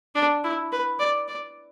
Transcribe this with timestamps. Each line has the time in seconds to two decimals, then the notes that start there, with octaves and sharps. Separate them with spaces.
0.15 D4
0.44 E4
0.72 B4
0.99 D5
1.28 D5